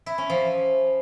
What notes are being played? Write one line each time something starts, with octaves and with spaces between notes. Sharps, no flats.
E4
C#4
F3